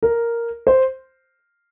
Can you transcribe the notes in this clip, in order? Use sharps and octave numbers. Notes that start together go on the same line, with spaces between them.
A#4
C5